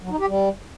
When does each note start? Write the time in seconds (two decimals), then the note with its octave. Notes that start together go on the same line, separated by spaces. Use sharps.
0.02 F#3
0.10 D#4
0.19 G4
0.28 G3